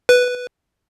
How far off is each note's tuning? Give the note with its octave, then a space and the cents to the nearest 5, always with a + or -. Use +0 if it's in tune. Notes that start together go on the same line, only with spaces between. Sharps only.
B4 +0